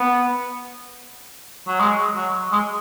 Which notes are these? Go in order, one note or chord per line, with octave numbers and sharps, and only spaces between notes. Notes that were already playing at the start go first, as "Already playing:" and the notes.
Already playing: B3
F#3
G#3
F#3
G#3